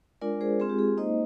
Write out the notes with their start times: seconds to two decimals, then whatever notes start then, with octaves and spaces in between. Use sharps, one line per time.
0.21 G#3 D4 F4 A#4 D5
0.41 G#4 C5
0.60 G#3 C4 F4 G#4
0.69 G4
0.79 G#4
0.98 A#3 D#4 C5 D#5